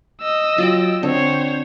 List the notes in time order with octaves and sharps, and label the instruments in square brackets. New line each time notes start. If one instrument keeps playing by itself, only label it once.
[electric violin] D#5 E6
[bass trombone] F#3 [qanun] F4 D5 G5
[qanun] D3 [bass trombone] C4 [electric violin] C5 C#5